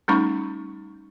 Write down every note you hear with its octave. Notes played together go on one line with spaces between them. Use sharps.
G3 A3 C#4 D#4 B5 C#6